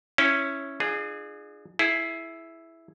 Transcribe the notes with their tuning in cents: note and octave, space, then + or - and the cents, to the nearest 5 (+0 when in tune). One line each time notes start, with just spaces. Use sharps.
C#4 -5 E4 +0 C#5 -20
D4 +45 F4 -5 G#4 +0
E4 +0 G#4 +25